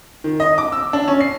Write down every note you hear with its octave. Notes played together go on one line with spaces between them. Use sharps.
D#3
D#5
D6
E6
D4
C#4
C7